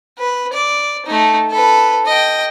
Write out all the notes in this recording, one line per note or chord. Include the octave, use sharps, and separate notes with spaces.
B4
D5
A3 D#4
A4 B4
D#5 G5